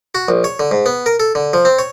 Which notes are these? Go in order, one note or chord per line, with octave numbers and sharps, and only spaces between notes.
F#4
A#1
C#5
D3
G#2
B3
A#4
A4
D3
F3
C4
C#5